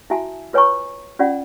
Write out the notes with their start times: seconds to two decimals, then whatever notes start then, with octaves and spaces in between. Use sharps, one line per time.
0.10 E4 F#4 E5 G#5 A5
0.53 F4 B4 C#5 G#5 A#5 C#6
1.19 C#4 F4 D5 F#5